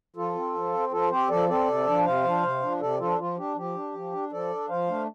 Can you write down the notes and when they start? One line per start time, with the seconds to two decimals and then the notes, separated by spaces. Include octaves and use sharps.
0.16 F3 F4 A4
0.35 C4
0.54 F3
0.73 C4
0.92 F3 F4 A4
1.10 C4 G4 C5
1.30 F3 A4 D5
1.48 C4 A4 D5
1.67 C3
1.87 F3 D4
2.05 C3 C5 F5
2.24 F3 D4
2.43 C3
2.62 F3 D4
2.80 C3 A4 D5
3.00 F3 D4 F4 A4
3.18 F3 F4
3.38 D4 G4
3.56 F3 G4
3.75 D4
3.94 F3
4.12 D4
4.32 F3 A4 D5
4.51 D4
4.69 F3 C5 F5
4.88 A3 D4